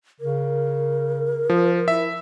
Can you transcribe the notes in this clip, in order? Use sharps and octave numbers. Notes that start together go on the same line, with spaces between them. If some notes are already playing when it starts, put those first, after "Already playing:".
C#3 A#4
F3
E4 E5